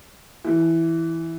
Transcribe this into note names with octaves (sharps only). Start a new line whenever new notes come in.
E3